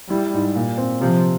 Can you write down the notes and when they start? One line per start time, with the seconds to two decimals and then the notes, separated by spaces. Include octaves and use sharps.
0.10 G3 E4
0.33 G#2
0.56 A#2
0.78 C4
1.00 C3 F3